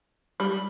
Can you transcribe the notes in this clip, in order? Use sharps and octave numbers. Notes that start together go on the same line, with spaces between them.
G3